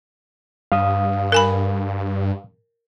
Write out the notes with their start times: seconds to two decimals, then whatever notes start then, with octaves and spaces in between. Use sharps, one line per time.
0.72 G2 F5 D#6
1.32 A#4 G#5 B5